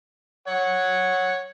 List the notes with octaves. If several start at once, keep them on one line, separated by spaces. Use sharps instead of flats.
C#5 F#5